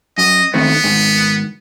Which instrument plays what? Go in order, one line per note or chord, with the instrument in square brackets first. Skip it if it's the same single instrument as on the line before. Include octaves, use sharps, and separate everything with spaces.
[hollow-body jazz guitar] F#2 [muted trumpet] D#5
[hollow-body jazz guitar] D#3 A3 C4 [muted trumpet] B3
[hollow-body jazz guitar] G#2 D#3